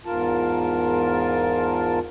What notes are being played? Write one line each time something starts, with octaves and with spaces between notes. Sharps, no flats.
E2 G#2 F4 A#4 A5